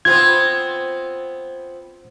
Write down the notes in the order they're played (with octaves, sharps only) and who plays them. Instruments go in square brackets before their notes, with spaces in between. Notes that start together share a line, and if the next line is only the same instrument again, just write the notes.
[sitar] B3 C4 F4 [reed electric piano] G#6